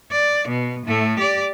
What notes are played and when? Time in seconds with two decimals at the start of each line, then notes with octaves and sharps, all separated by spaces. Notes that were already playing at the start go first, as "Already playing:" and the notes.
0.11 D5
0.48 B2
0.87 A2 A3
1.19 G4 D5